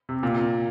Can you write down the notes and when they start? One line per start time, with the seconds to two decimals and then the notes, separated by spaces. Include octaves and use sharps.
0.09 C3
0.23 A#2